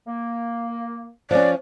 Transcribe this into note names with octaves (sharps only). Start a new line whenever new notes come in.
A#3
F3 C#4 D5